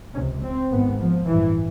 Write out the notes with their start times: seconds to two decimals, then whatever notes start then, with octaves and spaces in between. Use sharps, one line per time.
0.15 C3 C#4
0.19 C#2
0.42 C4
0.71 G#1 G#2 B3
0.99 F3
1.27 A1 G2 E3